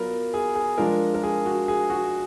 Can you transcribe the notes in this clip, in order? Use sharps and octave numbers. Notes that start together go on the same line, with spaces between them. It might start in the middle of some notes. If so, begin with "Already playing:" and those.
Already playing: F#3 B3 F4 A#4 B4 D5
G#4
G#4
F3 G#3 D4 F4 A#4
A#4
G#4
F#4
G#4
F#4